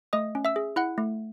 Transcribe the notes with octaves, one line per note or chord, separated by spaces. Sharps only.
A3 D#5 D#6
C#4
E5 E6
G#4
E4 F#5 F#6
A3